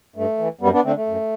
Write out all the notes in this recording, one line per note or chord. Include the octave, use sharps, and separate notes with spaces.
G2 A3
E3
F#2 G3 B3
B3 D4
D3 A3 C4
A3
F#2